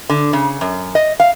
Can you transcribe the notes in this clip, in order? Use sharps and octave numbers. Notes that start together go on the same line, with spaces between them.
D3
C#3
F#2
D#5
F5